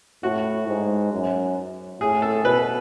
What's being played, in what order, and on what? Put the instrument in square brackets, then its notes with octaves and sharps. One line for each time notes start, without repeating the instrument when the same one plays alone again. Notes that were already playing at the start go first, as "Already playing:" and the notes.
[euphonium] A2 [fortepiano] F#4
[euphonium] G#2
F#2
[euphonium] A2 [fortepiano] G#4
[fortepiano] A4
[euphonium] B2 [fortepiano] B4